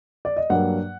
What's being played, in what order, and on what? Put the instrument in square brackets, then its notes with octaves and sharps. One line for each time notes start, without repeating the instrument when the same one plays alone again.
[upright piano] D5
D#5
G2 F#3 A#3 F#5